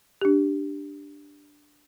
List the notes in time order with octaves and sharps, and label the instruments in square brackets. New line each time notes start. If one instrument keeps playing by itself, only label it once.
[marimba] D4 G4